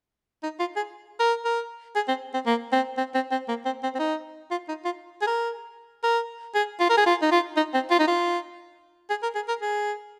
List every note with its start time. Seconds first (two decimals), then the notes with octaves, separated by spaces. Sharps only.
0.43 D#4
0.59 F4
0.76 G#4
1.19 A#4
1.45 A#4
1.95 G#4
2.08 C4
2.34 C4
2.46 A#3
2.72 C4
2.98 C4
3.14 C4
3.31 C4
3.48 A#3
3.65 C4
3.83 C4
3.95 C4
3.99 D#4
4.51 F4
4.68 D#4
4.85 F4
5.21 G#4
5.27 A#4
6.03 A#4
6.55 G#4
6.80 F4
6.89 A#4
6.97 G#4
7.06 F4
7.22 D#4
7.31 F4
7.56 D#4
7.74 C4
7.91 F4
7.99 D#4
8.07 F4
9.10 G#4
9.23 A#4
9.35 G#4
9.48 A#4
9.61 G#4